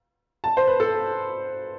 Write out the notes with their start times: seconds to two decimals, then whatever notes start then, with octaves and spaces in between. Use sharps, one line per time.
0.44 A5
0.57 C5
0.67 B4
0.80 A4